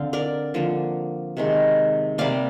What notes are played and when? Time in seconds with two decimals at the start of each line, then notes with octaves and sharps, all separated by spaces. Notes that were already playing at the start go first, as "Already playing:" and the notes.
Already playing: D3 C4 F5
0.13 A#4 D5
0.54 D3 F3 A#3
1.37 C3 D#3 G#3
2.18 C3 G3 A#3 D5 F5